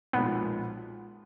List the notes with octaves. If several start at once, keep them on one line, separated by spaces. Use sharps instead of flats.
B1 A#2 F3 G#3 B3